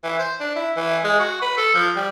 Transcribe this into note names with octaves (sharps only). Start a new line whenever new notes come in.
E3
C5
D4
E4
E3
G#3
F#4
B4
A4
F3
G3